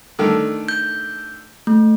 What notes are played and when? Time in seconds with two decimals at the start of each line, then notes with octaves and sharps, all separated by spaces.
0.19 D3 D#3 A3
0.68 G6
1.67 A3